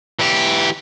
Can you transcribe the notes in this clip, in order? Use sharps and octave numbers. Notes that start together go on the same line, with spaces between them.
E3 G4